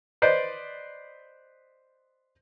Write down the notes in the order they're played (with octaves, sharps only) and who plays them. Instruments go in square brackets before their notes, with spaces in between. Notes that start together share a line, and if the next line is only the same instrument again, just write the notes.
[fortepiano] B4 C5 D5 D#5